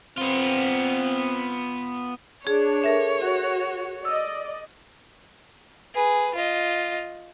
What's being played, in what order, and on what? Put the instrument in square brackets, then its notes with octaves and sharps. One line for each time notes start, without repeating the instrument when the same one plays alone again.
[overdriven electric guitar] B3 F4 [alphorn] C4
[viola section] D4 [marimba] G#4 [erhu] C#5
[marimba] A4 A#4 E5
[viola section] F#4
[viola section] D5 D#5 [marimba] E6
[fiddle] G#4 B4
F4 D#5